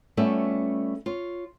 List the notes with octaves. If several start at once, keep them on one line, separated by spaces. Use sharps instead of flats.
G3 A3 B3 C#4 F4 E5
F4 C#5